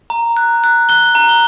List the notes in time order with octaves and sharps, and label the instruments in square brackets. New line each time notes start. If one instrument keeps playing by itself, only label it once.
[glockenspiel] A#5
F#6
F#6
F#6 G7
A#5
G7